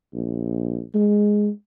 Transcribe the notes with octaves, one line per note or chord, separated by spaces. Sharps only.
A#1
G#3